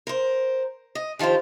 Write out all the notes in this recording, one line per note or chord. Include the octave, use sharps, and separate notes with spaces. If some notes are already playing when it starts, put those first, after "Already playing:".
A#4 C5
D#5
D#3 F3 F4 G4 C5